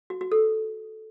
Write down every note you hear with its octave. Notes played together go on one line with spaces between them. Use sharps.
F#4
F#4
A4